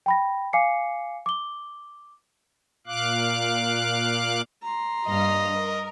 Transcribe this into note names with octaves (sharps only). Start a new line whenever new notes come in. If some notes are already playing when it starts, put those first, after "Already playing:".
G5 B5 A#6
F5 G#5 D6 C7 C#7
D6 G7
A#2 F5 D6 F#6
A#5 C6
G2 A#3 D#5 F6
A#4